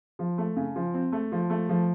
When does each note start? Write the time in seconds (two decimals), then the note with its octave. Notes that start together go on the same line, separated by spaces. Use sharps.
0.19 F3
0.38 A3
0.56 C#3
0.76 F3
0.94 C4
1.12 A3
1.32 F3
1.50 A3
1.69 F3